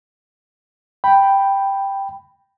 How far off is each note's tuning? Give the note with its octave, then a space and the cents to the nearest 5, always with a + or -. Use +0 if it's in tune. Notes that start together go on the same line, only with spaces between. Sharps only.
G5 +0 B5 +0